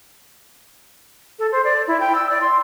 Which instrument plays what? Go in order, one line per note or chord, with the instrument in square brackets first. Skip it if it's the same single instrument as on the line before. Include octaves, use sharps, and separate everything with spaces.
[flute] A4
C5
D5
E4
G5
E6
D5
C6